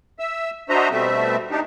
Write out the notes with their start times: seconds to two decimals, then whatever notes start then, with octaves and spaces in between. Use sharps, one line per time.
0.19 E5 E6
0.69 D4 F#4 C5 D#5 E5 A#5
0.91 B2 G3 A3 C4 E5
1.51 D4 D#4 G4